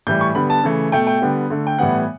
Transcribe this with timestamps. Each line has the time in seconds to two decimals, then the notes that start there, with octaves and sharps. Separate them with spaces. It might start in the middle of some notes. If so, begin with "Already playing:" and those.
0.07 A2 E3 G3 G6
0.21 C#6
0.35 D3 G3 B3 B5
0.50 A5
0.64 C#3 E3 A3
0.92 B2 A3 G5
1.07 G5
1.22 D3 G3 B3
1.50 D3 A3
1.67 G5
1.79 A2 E3 G3 B3 F#5